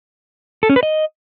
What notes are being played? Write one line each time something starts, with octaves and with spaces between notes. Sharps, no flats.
A4
C#4
B4
D#5